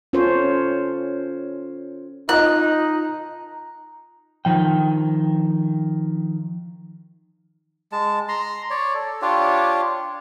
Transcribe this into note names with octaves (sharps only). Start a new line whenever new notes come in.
C#4 F4 A4 C5 C#5
D#4 F4 D#5 A#5 F#6
D#3 F3 G5
G#3 A5
A#5 C6
C#5 D5
A4
D4 F4 G4 C#5